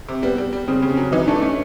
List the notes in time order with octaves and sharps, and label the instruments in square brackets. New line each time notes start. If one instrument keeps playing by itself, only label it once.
[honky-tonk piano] C3
[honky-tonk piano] G3 [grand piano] B3
[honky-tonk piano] G3
G3
[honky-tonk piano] C#3 [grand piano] C4
[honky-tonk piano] C#3
[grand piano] C#4
[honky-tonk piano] F#3
[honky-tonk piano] E3 [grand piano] D#4
[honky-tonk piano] A3 [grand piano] D4
[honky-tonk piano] A3 [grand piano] C#4